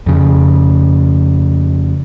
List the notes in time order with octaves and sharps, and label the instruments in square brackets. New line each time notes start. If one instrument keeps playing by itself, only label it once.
[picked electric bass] F2 C#3